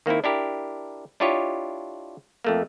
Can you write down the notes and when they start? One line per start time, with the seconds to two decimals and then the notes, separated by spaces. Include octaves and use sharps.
0.06 D#3 A#3 C4 D#4 E4
0.24 D4 E4 G4 A#4
1.20 D4 E4 F4 G4 C#5 D#5
2.45 F2 A3 A#3